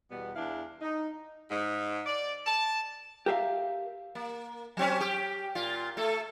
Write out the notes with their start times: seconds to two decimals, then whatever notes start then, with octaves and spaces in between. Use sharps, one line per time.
0.12 E2 B2 G3 B3
0.36 E2 E3 D4 E4 F5
0.82 D#4
1.51 G#2
2.06 D5
2.46 A5
3.26 G4 A#4 E5 F5
4.15 A#3
4.77 F#3 C4 C#4
5.00 G4
5.55 A#2 F4
5.97 A3 A4